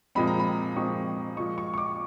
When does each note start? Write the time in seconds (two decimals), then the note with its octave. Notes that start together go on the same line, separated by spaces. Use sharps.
0.15 A#2 F3 G#3 C4 B5
0.27 A#5
0.39 B5
0.76 A#2 F3 G#3 C4 C#6
1.37 A#2 F3 G#3 C#6
1.58 C#6
1.74 C#6
1.78 D6